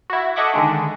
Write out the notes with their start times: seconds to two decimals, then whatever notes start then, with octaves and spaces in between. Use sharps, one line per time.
0.10 E4 F#4
0.36 A4 D#5 E5 F#5 C#6 D6
0.54 D3 D#3 G#3 D4